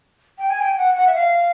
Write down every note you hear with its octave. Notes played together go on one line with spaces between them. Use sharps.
G5
G#5
G5
F#5
F#5
E5
F5